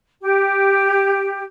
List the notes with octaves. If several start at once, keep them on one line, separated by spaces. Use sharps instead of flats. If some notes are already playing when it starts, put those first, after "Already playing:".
G4